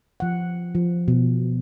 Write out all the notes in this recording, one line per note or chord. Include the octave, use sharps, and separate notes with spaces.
F3 F#5
F3
B2